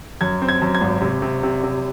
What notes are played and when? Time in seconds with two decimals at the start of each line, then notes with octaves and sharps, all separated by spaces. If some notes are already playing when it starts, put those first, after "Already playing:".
0.21 F#2 G#6
0.42 C4
0.49 G#6
0.62 F#2
0.75 G#6
0.81 G#1
1.02 C3
1.22 C3
1.43 C3
1.63 C3